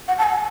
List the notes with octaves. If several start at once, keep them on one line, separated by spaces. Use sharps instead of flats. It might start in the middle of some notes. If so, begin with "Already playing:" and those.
F#5
A5
G#5